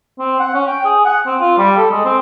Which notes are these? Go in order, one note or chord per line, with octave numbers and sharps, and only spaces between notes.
C4
F#5
C#4
G5
G#4
F#5
C4
F4
G3
A4
G#3
C4